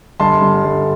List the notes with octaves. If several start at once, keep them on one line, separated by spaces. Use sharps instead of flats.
G1 A5 C6
G2 D3
G1